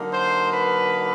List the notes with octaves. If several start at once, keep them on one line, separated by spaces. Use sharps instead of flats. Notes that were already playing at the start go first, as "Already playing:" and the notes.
Already playing: D3 F#3 A#3 D#4
C5
B4